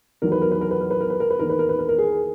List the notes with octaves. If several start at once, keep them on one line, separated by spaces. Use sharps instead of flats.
E2 D#3 F#3 A#4
B4
A#4
B4
A#4
B4
A#4
B4
A#4
B4
A#4
B4
E2 D#3 A#3 A#4
B4
A#4
B4
A#4
A#4
G#4